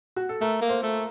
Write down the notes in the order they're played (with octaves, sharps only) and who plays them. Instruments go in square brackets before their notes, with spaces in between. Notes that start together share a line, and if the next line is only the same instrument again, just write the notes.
[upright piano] F#4
A4
[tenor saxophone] A3 [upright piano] A#4
[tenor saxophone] A#3
[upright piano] C5
[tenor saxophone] A3